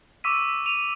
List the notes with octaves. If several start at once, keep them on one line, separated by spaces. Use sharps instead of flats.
C#6 D6 E6 B6 D#7
D#7 F7